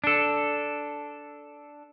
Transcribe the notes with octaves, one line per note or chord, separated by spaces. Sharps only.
D4 A4